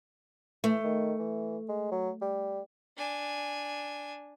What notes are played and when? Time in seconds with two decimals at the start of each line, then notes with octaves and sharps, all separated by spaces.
0.64 E3 A3
0.84 D#3
1.19 E3
1.69 G#3
1.92 F#3
2.22 G3
2.97 D4 G#5